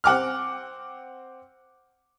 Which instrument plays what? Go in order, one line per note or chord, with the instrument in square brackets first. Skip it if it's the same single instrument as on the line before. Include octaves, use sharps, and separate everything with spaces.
[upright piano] C4 F#5 D6 F6